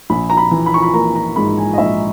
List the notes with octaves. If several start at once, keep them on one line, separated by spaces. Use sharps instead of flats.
A#1 B5
A#5
B5
E3
B5
C#6
B5
A#3 A#5
A#5
G#2 B5
G#5
D#5
A#1 E5